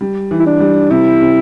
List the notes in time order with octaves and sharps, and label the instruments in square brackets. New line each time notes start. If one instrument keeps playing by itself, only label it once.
[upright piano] G3
E3
[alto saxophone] E4
D4
[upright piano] G3
[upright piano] C3 [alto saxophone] E4
[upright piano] C3